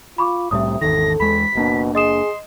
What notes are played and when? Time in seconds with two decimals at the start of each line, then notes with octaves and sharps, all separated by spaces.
0.18 F4 B5 C#6 D6
0.51 C2 A2 C3 G3 E5 D#6
0.81 G#1 E2 D#3 A4 A#6
1.20 E2 G#3 B5 B6
1.55 F#1 B2 A#3 D4
1.95 G#4 D#5 C6 D#6 E7